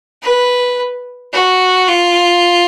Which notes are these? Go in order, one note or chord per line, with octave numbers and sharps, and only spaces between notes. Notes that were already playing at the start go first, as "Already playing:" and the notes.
B4
F#4
F4